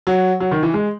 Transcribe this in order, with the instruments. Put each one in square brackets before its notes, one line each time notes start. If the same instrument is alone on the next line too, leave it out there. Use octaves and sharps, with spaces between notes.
[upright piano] F#3
F#3
D#3
E3
G#3